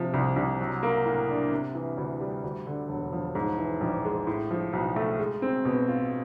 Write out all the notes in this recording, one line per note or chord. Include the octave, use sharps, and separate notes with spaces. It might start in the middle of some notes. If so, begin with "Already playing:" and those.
Already playing: C3 F3
C2
C2
F#3
A#3
A2
D4
C3
E3
D2
G3
D2
D3
E1
F3
G#2
E3
A#1
G#3
A2
F3
B1
A3
G#3
C4
B2
F4